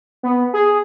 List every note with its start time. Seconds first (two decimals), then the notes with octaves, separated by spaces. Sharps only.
0.23 B3
0.53 G#4